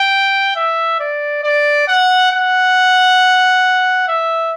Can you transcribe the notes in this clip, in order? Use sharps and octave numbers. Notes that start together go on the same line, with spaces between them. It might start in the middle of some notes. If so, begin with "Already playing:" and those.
Already playing: G5
E5
D5
D5
F#5
F#5
E5